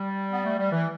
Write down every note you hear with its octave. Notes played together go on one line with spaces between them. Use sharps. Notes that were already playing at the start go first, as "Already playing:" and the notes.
Already playing: G3
B3
A3
G3
E3